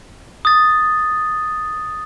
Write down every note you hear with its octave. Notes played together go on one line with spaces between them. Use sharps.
D#6 A6